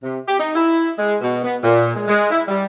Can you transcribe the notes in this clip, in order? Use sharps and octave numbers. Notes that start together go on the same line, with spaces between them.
C3
G4
D#4
E4
G#3
B2
B3
A#2
G#3
G#3
E4
G3